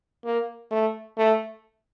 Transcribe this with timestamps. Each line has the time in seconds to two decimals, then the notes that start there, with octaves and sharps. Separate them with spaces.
0.25 A#3
0.71 A3
1.17 A3